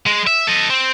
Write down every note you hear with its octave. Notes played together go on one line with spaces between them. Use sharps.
G#3
E5
A4 D#5
C4